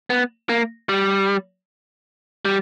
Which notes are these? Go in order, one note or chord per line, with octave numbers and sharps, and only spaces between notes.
B3
A#3
G3
G3